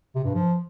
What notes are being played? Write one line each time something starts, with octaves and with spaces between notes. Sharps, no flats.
C3
G2
F3